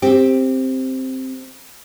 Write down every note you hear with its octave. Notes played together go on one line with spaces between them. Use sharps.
C4 G4